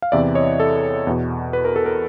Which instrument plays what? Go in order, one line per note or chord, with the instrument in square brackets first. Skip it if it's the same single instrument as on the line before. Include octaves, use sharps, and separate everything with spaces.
[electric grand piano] F5
E2 C3 E3 D5 E5
C#5 D#5
A4
E2 B2
B4
A#4
A4
A#4